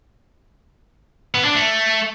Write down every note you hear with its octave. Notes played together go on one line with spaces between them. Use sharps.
B3
D4
A3